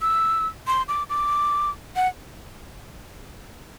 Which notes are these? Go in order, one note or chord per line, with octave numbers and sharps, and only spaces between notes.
E6
C6
D6
D6
F#5